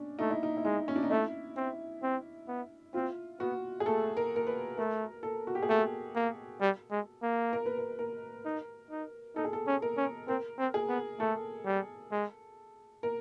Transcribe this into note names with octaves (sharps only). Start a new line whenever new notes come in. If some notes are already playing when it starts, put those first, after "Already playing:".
Already playing: C#4 D4
A3 D#4
E4
D#4
E4
G#3 D#4
C#4
D4
D#4
A3 E4
C4
C4
B3
C4 F4
B3 F#4
G#4
A3 A4
A#4
A#4
B4
A3 A#4
A4
F#4
G4
G#4
A3 A4
A#3
G3
G#3
A#3
A#4
B4
A#4
A#4
D#4
D#4
D#4 A4
G#4
A4
C#4
A#4
C#4
C4 A#4
C4
G#4
B3
A3 A4
G3
G#3
A#4